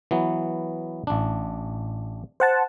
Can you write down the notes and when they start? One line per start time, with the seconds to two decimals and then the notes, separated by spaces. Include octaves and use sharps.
0.11 E3 F#3 B3
1.07 A1 D4
2.40 C5 F#5 A5